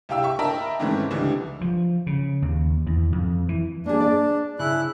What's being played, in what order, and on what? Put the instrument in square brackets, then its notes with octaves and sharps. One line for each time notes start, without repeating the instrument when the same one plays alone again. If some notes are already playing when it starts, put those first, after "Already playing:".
[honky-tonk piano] C2 G4 F5 G5 E6
E5 C#6
A#4 D#5 E5 G5 A5 B5
G#2 D#3 E3 A3 C4 C#4
C#2 D3 E3 G3
[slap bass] F3
C#3
D#2
E2
F2
E3
[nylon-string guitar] A#3 G#4 [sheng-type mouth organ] D4
[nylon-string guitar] D5
[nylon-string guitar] C#3 [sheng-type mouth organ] E4 F#6